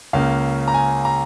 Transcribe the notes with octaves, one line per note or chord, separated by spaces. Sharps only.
C#2 C#3 A#3 F5
A#5
G#5
A#5